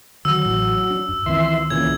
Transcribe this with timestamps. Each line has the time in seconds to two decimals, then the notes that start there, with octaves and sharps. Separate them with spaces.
0.25 D3 D#3 F#3 E6
0.45 A1 A2 E3
0.90 D4
1.09 F#2
1.26 C#2 D#3 E3 C4 E5 C6
1.70 A#2 C#3 E3 G#6